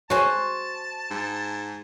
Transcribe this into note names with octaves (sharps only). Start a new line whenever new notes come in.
F#4 C5 C#5 G#5 A5
G#2